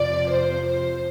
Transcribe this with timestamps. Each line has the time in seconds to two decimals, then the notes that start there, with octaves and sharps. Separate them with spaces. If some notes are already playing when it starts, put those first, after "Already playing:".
Already playing: F2 C3 F3 D5
0.32 C5
0.66 C5